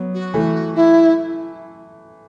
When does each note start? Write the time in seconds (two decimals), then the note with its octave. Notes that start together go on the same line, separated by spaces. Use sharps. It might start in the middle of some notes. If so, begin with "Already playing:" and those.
Already playing: F#3 B3
0.14 F#4
0.34 E3 A3
0.75 E4